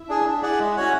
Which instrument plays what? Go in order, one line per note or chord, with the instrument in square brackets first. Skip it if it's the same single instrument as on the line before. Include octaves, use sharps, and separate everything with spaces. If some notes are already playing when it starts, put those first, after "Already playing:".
Already playing: [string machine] E4 E5
[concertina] D4 G#4
D4
G#4 D5 F#5
G#3
C#4 F#4 C#5 F#5